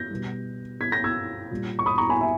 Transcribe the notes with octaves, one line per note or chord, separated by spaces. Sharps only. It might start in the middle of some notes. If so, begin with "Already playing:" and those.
Already playing: G6 A#6
B2 G3
G#6 B6
G6 A#6
E6 G#6
A#2 G3
C#6
B5 D#6
A#5 C#6
G#5 B5
E5 G#5